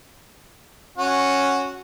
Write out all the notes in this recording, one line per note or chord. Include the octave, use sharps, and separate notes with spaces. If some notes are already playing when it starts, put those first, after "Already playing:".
C#4 F#4